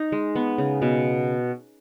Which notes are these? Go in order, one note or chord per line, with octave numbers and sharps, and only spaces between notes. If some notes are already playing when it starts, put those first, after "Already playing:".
Already playing: D#4
G#3
B3
C#3
B2